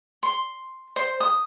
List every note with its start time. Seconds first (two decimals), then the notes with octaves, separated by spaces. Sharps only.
0.23 C6
0.96 C5
1.20 D#6